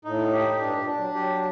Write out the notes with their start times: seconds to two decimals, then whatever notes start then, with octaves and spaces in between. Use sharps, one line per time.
0.05 A2 D#4
0.33 G4
0.60 G2 D4
0.78 A#2
0.87 D4
0.97 F#3
1.15 F#3 G4